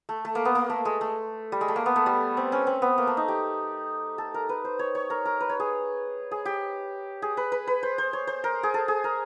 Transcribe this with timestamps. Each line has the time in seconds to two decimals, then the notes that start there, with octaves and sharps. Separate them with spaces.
0.09 A3
0.25 A3
0.35 A#3
0.45 B3
0.55 A#3
0.70 A3
0.85 G#3
1.01 A3
1.52 G3
1.61 G#3
1.68 A3
1.76 A#3
1.86 B3
1.96 A3
2.06 G3
2.37 C4
2.52 C#4
2.67 C4
2.82 B3
2.98 A#3
3.07 A3
3.17 D#4
3.28 G4
4.18 A4
4.34 A#4
4.49 B4
4.65 C5
4.79 C#5
4.95 C#5
5.10 A#4
5.25 A#4
5.41 B4
5.49 C#5
5.60 G#4
6.31 G#4
6.45 G4
7.22 G#4
7.37 B4
7.52 B4
7.67 B4
7.83 C5
7.98 C5
8.13 C#5
8.27 C5
8.44 A#4
8.63 G#4
8.74 A4
8.88 G#4
9.04 A#4